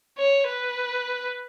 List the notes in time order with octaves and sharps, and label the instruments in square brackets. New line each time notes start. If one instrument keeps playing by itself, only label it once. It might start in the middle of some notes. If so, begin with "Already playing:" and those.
[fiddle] C#5
B4